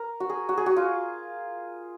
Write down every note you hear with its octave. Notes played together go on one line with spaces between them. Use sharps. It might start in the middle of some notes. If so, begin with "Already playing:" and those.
Already playing: A#4
F#4
G#4
F#4
G#4
F#4
F4